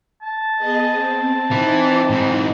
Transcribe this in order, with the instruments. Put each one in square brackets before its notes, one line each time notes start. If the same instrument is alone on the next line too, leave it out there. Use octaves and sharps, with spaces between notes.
[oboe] A5
[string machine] B3 G#4 D#5
C4
[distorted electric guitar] E3 [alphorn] C4 [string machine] D#4
[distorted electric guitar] G#2 E3